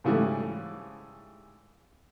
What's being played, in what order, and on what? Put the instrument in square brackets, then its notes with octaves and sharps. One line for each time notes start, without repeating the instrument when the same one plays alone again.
[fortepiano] G#2 C#3 E3 G3 A3